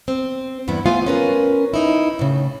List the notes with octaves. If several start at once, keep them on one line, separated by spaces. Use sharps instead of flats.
C4
E2 G2 B3 E4
A3 B3 F4 F5 G#5
C#4 A#4 B4
D#4 E4
A2 C#3